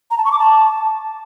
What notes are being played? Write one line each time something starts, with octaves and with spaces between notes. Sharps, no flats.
A#5
A5
C#6
D6
A5